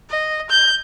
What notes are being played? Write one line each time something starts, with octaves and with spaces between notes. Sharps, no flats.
D#5
G6